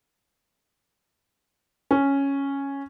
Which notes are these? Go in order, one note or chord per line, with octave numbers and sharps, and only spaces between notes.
C#4